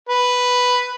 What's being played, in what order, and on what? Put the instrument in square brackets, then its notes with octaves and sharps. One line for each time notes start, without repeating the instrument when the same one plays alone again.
[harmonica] B4